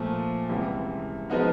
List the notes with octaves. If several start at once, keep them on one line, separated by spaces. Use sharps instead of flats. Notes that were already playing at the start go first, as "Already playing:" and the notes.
Already playing: A#2 F3 A3
C#2 C3 E3 G3
F3 G#3 B3 D#4 F#4